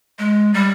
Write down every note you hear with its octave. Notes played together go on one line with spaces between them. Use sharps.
G#3
G3